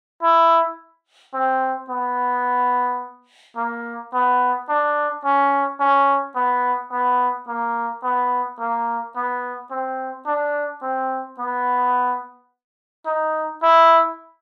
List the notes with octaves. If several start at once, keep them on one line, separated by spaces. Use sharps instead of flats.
E4
C4
B3
A#3
B3
D4
C#4
C#4
B3
B3
A#3
B3
A#3
B3
C4
D4
C4
B3
D#4
E4